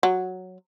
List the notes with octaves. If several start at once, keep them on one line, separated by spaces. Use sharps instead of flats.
F#3